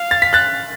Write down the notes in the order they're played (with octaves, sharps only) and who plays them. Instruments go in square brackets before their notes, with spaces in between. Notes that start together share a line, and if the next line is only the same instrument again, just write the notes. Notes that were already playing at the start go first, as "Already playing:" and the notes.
Already playing: [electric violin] F5
[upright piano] A6
B6
F#6 A6